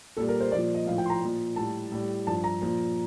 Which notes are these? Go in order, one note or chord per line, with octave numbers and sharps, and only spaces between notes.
A#2 G3 A4
A#4
C5
A#2 F3 D5
D#5
A2 F3 F5
G5
C6
A#5
A#2 F3
A2 G3 A5
A2 G3
G2 F3 A5
A#5
A#2 F3